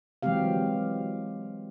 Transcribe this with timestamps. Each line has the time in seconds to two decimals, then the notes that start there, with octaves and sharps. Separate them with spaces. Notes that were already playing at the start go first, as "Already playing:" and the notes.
0.23 E3 F#3 G#3 C4 G4 F5